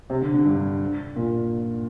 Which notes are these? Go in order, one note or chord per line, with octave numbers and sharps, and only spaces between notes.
C3
D3
D3
G2
A#2